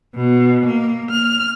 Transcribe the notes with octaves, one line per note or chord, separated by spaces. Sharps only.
B2
A#3
F6